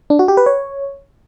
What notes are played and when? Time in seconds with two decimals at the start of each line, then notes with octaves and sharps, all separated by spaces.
0.10 D4
0.19 F#4
0.28 G4
0.37 B4
0.46 C#5